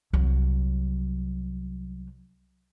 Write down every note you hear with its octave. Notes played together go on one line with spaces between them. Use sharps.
C2 F#3